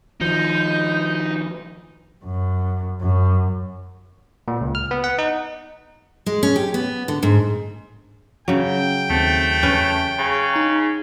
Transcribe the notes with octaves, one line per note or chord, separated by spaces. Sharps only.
D#3 F3 D#4 G6
F#2
F#2
A#2
C#2
F6
B3
F#5
D#4
G#3
C#4
G4
B3
D3
G#2
C#3 F#3 G5
D#2 A3 C4 A6
E2 C#4 B4
C#3 B5
D#4 A#5